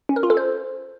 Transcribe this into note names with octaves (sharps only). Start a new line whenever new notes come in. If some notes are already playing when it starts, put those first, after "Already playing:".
C#4
A#4
F4
A4
C5